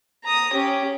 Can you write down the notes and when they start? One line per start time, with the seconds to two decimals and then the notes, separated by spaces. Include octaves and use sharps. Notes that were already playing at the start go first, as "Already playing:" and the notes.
0.24 A#5 D#6
0.53 C#4 G4